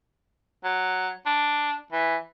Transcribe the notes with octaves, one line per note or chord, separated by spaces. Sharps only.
F#3
D4
E3